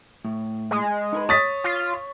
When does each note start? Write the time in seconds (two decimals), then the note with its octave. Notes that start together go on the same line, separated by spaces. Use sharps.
0.25 A2
0.71 G#3
1.13 D#4 A#4 B4
1.29 C#5 D#6 A6 B6
1.64 F4